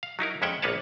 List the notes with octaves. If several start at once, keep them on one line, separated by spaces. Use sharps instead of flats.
F5
F#3 D#4 E4 A#4
F2 G#3 C#4 E5 F#5 G5
A#1 A#3 B3 B4 C#5 A5